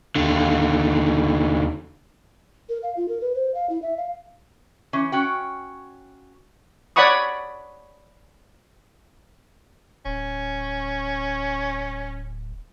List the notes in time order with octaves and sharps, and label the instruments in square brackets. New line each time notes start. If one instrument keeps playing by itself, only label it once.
[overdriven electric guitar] D#2 D3
[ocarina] A#4
F5
F4
A#4
B4
C5
F5
E4
E5
F5
[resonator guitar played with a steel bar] E3 C#4
C#4 F#4 G5
[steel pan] C#5 D5 F#5 B5 C#6 D#6
[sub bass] D1 [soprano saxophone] C#4